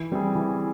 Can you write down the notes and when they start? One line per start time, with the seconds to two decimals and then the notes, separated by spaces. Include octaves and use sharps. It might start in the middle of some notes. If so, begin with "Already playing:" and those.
Already playing: E3
0.12 G3 C4 E4 G#4
0.35 E3